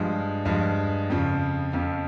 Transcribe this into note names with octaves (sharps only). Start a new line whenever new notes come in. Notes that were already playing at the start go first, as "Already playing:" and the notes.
Already playing: G2 F3 G#3
G2 F3 G#3
F2 C#3 F3
F2 C#3 F3